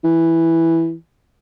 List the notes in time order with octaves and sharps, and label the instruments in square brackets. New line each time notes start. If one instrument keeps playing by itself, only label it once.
[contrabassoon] E3